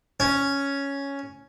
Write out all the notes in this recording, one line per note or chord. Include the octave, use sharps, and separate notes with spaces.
C#4